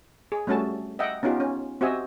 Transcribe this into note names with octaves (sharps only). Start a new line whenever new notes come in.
G#4
G3 A3 C#4 F#4 A5
D#5 E5 F#5 G5
B3 C#4 D#4 F4 G4
C#4
C4 F#4 G4 D#5 E5 G#5